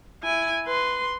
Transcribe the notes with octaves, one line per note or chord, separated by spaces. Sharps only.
E4 G#5
B4 C6